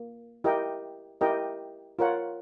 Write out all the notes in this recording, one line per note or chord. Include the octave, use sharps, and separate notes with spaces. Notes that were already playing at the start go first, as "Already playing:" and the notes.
Already playing: A#3
E4 G4 A#4 D#5 G5
E4 G4 A#4 D#5 G5
F4 A#4 C#5 F#5